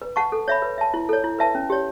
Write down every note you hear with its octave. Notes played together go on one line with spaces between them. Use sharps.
B4
F#5 A5 C#6
A4
C#5 E5 B5
B4
E5 A5
E4
A4 C#5
E4
B4 E5 A5
C#4
G4 C#5